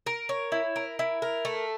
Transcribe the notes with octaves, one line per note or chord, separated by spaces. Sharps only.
A#4
C#5
E4
A#4
E4
A#4
A3